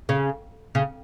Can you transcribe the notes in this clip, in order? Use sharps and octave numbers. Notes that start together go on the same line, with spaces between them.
C#3
C#3